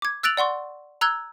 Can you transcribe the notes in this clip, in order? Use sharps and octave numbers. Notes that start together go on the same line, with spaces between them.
D6 G#6
E6 F#6 A6 D7 F7 F#7
D5 F#5 C6 C#6
A#5 E6 F#6 G#6 G7